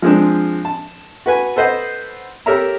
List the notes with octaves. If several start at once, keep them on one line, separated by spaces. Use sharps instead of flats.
F3 G#3 C4 D4
A5
F#4 B4 G#5
A4 B4 C5 D#5 F#5
G4 A4 A#4 C#5 E5 A#5